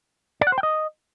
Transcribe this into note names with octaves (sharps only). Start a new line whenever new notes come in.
D5
F#5
C5
G5
D#5